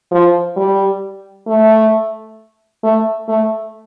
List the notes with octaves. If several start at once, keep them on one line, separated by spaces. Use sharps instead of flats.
F3
G3
A3
A3
A3